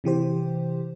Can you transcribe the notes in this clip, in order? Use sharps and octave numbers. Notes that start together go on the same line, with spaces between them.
C3 E3 G4 C5